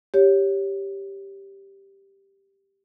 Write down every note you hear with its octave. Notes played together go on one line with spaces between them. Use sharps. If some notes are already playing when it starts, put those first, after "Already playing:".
G4 C#5